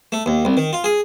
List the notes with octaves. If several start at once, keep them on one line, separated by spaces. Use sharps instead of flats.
A3
D#2
C2
D#3
F4
G#4